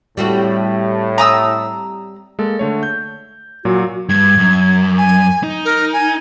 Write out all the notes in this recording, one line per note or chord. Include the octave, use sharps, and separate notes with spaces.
A2 G3 C4 F#4
A#5 D#6 E6
G#3 A#3 A4
D3 A3 C#5
G6
A#2 F#3 F#4
G2 G#6
F#2
G#5
D#4
A#4
G#5